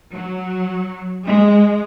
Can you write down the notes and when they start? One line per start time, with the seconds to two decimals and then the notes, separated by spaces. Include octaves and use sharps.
0.13 F#3
1.23 G#3